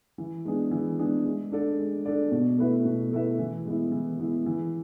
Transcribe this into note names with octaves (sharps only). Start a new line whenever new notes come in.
E3
G#3 B3 D4 G#4
E3
G#3 B3 D4 G#4
G#3
D4 A4 D5
G#3
D4 A4 D5
B2
A3 E4 B4 E5
B2
A3 E4 B4 E5
E3
G#3 B3 E4
E3
G#3 B3 E4
E3